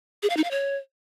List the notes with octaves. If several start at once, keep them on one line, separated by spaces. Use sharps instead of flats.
G#4
F5
D#4
F5
C#5